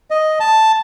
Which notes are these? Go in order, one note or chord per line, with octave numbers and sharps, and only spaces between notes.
D#5
A5